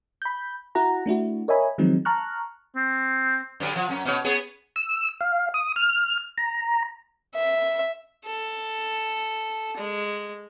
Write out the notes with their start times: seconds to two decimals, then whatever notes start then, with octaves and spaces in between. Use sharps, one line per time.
0.22 B5 G6
0.75 E4 F#4 F#5 A#5
1.06 A3 D4 E4 F#4
1.48 A#4 C#5 D#5 E5 G#5 B5
1.78 D#3 F3 F#3 G#3 C4 D#4
2.05 A5 A#5 C#6 F6 F#6
2.76 C4
3.60 G2 D3 F#3
3.76 F3
3.89 F#2 C#4
4.05 B2 C#5
4.24 B3 G#4 C#5
4.76 E6
5.21 F5
5.54 D#6
5.76 F6
6.38 A#5
7.35 E5
8.25 A4
9.77 G#3